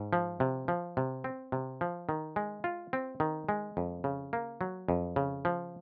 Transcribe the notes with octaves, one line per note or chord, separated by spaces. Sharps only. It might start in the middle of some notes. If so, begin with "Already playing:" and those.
Already playing: G#2
F3
C3
F3
C3
C4
C3
F3
D#3
G#3
F4
C4
D#3
G#3
F2
C#3
A#3
F#3
F2
C#3
F3